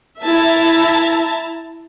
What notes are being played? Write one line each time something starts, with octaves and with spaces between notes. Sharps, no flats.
E4 E5 A5 A#5